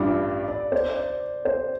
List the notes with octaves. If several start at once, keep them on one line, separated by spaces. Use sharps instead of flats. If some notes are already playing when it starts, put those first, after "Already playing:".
Already playing: A1 G2 G3 D4 F4 D5
D5
C5
D5
C5